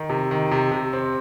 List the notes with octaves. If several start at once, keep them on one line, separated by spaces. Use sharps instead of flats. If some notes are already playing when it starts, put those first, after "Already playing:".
Already playing: D#3
C3
D#3
C3
C3
C4